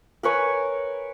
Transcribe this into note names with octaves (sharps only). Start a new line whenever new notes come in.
A#4 B4 C#5 G#5